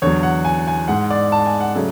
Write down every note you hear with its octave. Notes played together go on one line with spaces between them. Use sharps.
E2 D3 F#3 C#5
F#5
G#5
G#5
G#2 G#3 F#5
D5
A5
G#5
F#5
C#3 F#3 A3